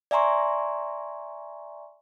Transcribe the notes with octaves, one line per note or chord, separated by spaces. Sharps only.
D5 E5 G#5 A#5 C6 C#6